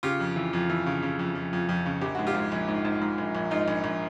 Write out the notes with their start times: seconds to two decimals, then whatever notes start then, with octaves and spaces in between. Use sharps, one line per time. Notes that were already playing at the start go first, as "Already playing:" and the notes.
0.03 C#3 F4 G4
0.20 F2
0.36 E3
0.53 F2
0.70 E3
0.86 C#3
1.02 C#3
1.19 F2
1.35 F2
1.53 F2
1.69 F2
1.86 C#3
2.02 A#1 G4
2.15 G#2 F#4
2.27 F4 G4
2.35 G#2
2.52 A#1
2.68 G#2
2.85 G#2
3.02 G#2
3.18 A#1
3.35 A#1
3.51 G#2 D#4 F4
3.68 A#1
3.84 A#1